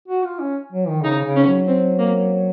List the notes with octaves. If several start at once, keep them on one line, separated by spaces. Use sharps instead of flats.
F#4
F4
C#4
F#3
D#3
C#3 D#4
C#3
C#4
F#3
C4
A#3